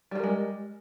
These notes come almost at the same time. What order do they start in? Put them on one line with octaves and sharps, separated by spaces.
G3 F3 A#4 G#3